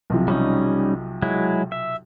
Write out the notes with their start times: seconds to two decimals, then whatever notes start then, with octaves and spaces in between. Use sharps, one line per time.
0.10 B1 C3 F3
0.28 G3 C#4 D#4
1.22 F#3 G#3 E4
1.72 E5